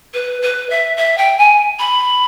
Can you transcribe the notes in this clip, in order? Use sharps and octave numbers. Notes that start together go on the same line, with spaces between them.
B4
B4
E5
E5
G5
G#5
B5